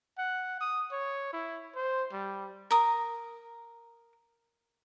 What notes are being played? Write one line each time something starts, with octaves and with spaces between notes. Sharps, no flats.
F#5
D#6
C#5
E4
C5
G3
A#4 D#6